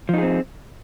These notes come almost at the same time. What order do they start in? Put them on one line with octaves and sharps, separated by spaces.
F3 D#4 G#4 C4